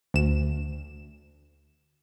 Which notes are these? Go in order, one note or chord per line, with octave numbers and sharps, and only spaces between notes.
D2 E7